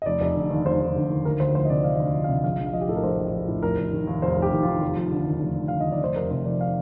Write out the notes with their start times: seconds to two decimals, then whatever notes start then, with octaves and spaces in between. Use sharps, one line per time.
0.02 D#5
0.06 F1 D5
0.21 F1
0.35 D3
0.51 D#2
0.66 F1 C5
0.81 F1
0.96 D3
1.10 D#2
1.25 D2 A#4
1.40 D2 C5
1.55 F3 C5
1.65 D#5
1.70 C3 D5
1.84 D2 F5
1.96 D#5
2.00 D2
2.05 F5
2.14 F3
2.24 F5
2.29 C3
2.44 A#1 F5
2.59 A#1
2.66 F5
2.73 F3 D#5
2.81 G4
2.89 A2 A4
2.96 A#4
3.03 A#1 C5
3.19 A#1
3.33 F3
3.48 A2
3.62 F1 A#4
3.78 F1
3.93 D#3
4.07 D#2
4.22 F1 C5
4.37 F1
4.42 G4
4.52 D#3
4.63 D#2 F4
4.82 F1
4.97 F3
5.12 D3
5.27 D#2
5.41 F1
5.56 F3
5.68 D3 F5
5.80 D#5
5.86 D#2
5.92 D5
6.01 F1 C5
6.16 F1 A#4
6.31 C3 C5
6.45 F2 D5
6.61 F5